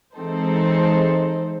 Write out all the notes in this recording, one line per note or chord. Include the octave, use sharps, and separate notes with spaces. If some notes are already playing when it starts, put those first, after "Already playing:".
E3 G#3 C4 D#4 A4 C5